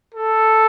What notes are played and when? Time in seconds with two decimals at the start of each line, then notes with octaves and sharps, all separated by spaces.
0.14 A4